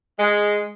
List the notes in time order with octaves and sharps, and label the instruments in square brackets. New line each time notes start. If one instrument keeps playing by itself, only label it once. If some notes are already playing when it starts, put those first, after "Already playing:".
[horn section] G#3